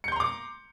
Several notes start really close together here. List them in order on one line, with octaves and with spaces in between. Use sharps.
C#7 G6 C6 A#5 D6